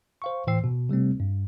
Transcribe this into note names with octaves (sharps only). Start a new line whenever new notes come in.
C5 F5 C#6
A2 E3 C5 G5 E6 C7
B2
C3 G3 A3 C4
G2